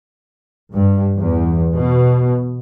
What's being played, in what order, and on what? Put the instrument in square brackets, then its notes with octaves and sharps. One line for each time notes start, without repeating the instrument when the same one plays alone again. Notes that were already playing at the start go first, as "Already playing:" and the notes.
[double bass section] G2
E2
B2